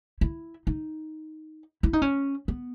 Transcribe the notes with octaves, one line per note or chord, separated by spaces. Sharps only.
E4
D#4
E4
D#4
C#4
B3